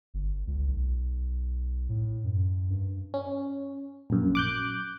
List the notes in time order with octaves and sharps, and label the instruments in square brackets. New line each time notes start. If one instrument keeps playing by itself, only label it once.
[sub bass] G1
C#2
B1
A2
F#2
G2
[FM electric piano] C#4
A#1 F#2
D6 F#6 G6